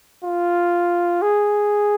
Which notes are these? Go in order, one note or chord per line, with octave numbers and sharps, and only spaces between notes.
F4
G#4